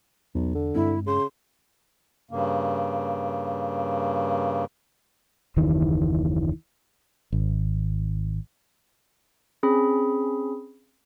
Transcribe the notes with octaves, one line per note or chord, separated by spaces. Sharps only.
B1 E2
D3
G2 G#3 C4 E4
C#3 C6
G2 C#3 A#3
F#1 D#2 D#3 E3
G#1
C4 C#4 G#4 B5